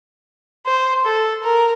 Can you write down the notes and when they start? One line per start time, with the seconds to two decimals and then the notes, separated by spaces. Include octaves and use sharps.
0.66 C5
1.05 A4
1.44 A#4